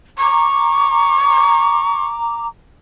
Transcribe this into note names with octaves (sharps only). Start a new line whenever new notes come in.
A#5 C#6 D6